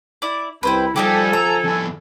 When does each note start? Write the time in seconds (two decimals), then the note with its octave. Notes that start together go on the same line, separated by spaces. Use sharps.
0.22 E4 D5
0.63 C2 E4 B4 C5 G5
0.96 F3 G3 D#4 E4 G4 A4 G#5
1.33 A#5 E6
1.64 F2 E4